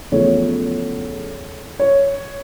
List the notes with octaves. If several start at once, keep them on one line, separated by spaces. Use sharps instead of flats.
E2 C#3 F3 A3 C#5
C#5